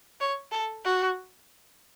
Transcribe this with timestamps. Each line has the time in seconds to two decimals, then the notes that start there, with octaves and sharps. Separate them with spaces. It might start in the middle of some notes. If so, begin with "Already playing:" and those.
0.20 C#5
0.52 A4
0.85 F#4